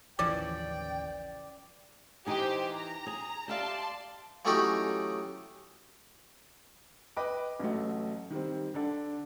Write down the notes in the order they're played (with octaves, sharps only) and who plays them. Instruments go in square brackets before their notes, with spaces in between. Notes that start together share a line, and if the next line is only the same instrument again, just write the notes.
[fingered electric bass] A1 D#2 [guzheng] C#3 E3 F3 [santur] D5 [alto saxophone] G5
[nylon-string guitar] E3 D#4 G#4 [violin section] G4 C5
[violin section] A#5
[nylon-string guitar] G#4
[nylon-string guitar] G4 E5 F5 [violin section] D5 A5 C6
[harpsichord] E3 F#3 A3 C#4 D#4 G4
[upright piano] B4 D#5 G5 B5 D6
A1 F#3 A3
D#3 G3 C4
D3 D4 A4